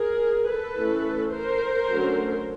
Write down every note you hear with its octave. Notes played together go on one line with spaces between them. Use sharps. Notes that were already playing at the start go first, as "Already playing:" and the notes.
Already playing: G#4 A#4
A4 B4
E3 A3 C#4
A#4 C5
D3 F#3 A3 C#4